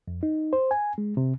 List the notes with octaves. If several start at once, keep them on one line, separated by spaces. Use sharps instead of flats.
F2
D#4
C5
G#5
G#3
C3